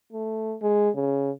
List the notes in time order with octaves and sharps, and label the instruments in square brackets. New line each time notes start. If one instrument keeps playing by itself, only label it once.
[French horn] A3
G#3
C#3